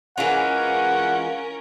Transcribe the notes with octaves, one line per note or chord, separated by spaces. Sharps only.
E3 G#3 C#4 F4 A#4 F#5